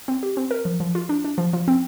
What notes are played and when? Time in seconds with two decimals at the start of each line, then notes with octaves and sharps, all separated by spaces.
0.08 C4
0.23 G4
0.37 C4
0.51 A#4
0.65 F3
0.80 F3
0.95 F4
1.09 D4
1.24 D4
1.38 F3
1.53 F3
1.68 C4